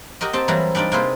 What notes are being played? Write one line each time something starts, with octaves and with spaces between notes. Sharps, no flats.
F#4 G4 A#4 D#5
C4 G4 A5
E3 F#3 G3 A#3 E4 F#4
G3 D4 D#4 F4 D5
C3 A#3 F4 G#4 B4 C5